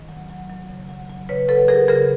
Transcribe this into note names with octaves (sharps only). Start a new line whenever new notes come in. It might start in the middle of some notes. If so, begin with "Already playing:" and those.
Already playing: D#3
F#3
F#3
F#3
C#3
F#3
F#3
C#3 B4 C#5
F#3 A4 B4
F#3 G#4 A#4
C#3 G#4 A#4